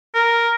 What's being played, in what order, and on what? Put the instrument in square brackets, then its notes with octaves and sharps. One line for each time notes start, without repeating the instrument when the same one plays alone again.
[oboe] A#4